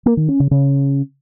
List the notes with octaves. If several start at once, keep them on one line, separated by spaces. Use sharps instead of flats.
A#3
D#3
C#4
C#3
C#3